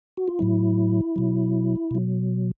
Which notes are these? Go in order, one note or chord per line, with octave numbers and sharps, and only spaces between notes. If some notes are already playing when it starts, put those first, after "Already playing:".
F#4
F4
A2 F#3 E4
B2 F#3
B2 F#3